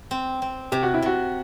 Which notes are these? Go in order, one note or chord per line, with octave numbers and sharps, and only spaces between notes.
C4
C4
C3 G4
F#4
E4
C3 F#4